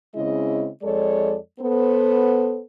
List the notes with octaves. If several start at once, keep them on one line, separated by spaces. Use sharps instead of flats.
C#3 G#3 C4 C#4 E4 D#5
F2 G#3 A4 C#5 D5
B3 A4 C5